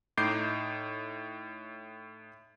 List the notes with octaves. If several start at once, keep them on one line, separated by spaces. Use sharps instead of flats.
A2 D#4 D6 G6 C7 D7